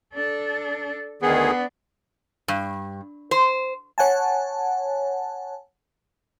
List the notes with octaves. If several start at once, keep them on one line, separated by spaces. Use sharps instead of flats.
D4 A4
D2 D#3 B3 D4 G#4
G2
C5
C#5 F#5 G#5 A5